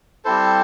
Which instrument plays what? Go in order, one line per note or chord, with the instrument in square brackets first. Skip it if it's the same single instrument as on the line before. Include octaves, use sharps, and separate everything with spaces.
[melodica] G3 C4 E4 A4 C5